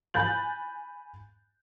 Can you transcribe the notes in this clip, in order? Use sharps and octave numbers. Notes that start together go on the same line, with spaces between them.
G#5 B5 F#6 G6 A6 F#7